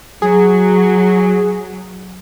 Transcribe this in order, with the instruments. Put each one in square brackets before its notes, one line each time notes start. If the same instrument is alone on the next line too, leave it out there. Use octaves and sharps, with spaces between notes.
[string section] F#3 [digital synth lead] G#4